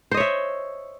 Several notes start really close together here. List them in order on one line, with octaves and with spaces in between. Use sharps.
C5 D#5 C#5 E5